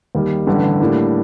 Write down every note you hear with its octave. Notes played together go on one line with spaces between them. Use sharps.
D#2 D#3 G3
A1 G2 D3
A2 G3 A#3 D4